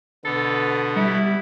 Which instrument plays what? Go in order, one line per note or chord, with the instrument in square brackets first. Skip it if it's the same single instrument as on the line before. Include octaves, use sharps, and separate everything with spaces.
[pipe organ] B2 B3 [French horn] D3 [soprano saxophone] A4
[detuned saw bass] G3 [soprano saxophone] E4